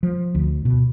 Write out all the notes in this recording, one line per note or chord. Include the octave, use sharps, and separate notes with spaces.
F3
D2
B2